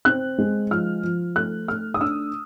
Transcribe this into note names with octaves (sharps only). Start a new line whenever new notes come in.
C4 F#6
G#3
F3 F6
F3
A3 F#6
A3 F6
D#6
D4 E6